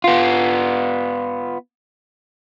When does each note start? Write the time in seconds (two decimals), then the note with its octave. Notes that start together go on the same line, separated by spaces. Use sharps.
0.04 B3 F4